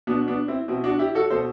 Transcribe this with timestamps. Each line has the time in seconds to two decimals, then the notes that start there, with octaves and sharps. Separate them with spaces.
0.07 B2 B3 D4
0.28 B3 D4
0.48 C4 E4
0.68 B2 C4 E4
0.84 D4 F#4
0.99 E4 G4
1.14 F#4 A4
1.30 B2 A4 C5